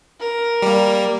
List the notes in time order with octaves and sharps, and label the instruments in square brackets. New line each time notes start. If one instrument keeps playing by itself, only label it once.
[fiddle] A#4
[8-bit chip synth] G3 A#3